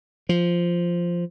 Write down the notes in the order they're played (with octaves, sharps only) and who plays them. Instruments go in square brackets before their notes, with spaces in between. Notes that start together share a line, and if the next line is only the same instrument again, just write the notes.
[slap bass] F3